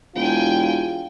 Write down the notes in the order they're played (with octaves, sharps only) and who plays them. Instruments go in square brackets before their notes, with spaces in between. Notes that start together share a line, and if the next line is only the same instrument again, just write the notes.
[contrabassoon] E1 [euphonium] F4 [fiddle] G5 G#5